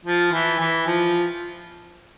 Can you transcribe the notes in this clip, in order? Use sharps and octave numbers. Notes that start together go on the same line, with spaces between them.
F3
E3
E3
F3